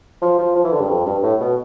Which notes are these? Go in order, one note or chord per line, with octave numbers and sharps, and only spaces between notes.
F3
F3
F3
E3
D3
G2
F2
G2
A2
B2